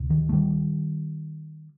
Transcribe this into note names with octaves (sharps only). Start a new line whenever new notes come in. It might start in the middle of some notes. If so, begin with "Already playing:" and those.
Already playing: D2 C3
D#3
A3
D#3 G3